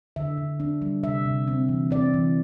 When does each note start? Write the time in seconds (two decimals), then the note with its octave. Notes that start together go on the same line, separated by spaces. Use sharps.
0.16 D3 E5
0.37 D3
0.60 D4
0.82 G3
1.03 C3 E5
1.25 C3
1.48 C4
1.69 E3
1.91 C4 D5
2.14 E3